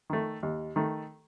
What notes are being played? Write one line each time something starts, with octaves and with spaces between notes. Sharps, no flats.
D#3 A3
D#2
D#3 A3